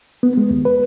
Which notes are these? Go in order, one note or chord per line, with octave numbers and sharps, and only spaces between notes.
B3
G#3
D#2
B4